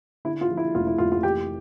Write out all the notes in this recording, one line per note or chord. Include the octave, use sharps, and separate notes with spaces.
D3 E4
F4
F3
E4
F1 F4
E4
F1 F4
F4
E3 G4